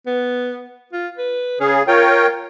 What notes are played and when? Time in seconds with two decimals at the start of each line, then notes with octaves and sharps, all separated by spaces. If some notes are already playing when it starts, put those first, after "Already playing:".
0.06 B3
0.93 F4
1.17 B4
1.60 C#3 C#4 G#4
1.88 F4 A#4 C#5 G5